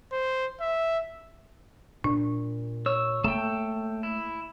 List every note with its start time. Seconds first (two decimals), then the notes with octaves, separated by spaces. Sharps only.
0.12 C5
0.60 E5
2.04 A#2 D4
2.86 C#5 E6
3.24 A3 A#3 A4 G5
4.03 E4